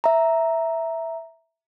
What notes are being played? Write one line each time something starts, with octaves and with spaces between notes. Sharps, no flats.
E5 A#5